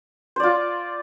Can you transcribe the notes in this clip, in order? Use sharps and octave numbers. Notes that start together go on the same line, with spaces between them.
F4 C5 D5